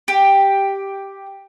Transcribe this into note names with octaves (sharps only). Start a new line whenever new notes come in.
G4